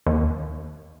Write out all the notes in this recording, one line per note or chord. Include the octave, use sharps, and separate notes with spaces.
D#2